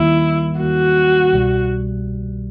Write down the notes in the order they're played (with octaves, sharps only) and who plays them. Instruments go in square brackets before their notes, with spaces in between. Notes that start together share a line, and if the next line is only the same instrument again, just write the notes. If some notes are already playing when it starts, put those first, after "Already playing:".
Already playing: [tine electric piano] D#2 D#3 G3 A#3 [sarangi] E4
[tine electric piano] D#2 D#3 G3 A#3 [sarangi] F#4
[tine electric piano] C2 B2 G3